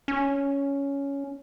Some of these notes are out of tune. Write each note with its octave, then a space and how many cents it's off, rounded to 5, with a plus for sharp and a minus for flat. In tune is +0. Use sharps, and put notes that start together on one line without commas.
C#4 +10